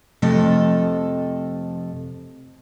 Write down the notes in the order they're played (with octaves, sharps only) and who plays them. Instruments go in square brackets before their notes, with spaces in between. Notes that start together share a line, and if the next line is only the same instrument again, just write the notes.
[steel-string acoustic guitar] F2 C3 F3 A3 A4 D#5